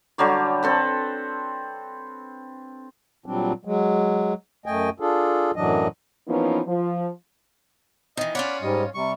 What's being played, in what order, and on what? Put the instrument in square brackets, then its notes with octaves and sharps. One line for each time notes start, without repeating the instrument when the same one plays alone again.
[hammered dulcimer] D3 F#3 G3 C#5
C4 A4 B4
[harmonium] A#2 F#3 G3 C4 D4
F#3 G#3
F#2 A3 D#5 G5 G#5
D4 F4 G#4 A4
F#2 A2 E3 F#3 D4 D#5
[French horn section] E3 F3 A#3 B3 C#4 D#4
F3
[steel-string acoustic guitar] D#3 E3 [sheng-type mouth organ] D#5
[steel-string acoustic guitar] C#4 F4 C#5 [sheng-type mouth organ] D5 F#5 B5
[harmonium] G#2 G3 [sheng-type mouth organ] D#5
[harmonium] C3 G3 [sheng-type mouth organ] C#6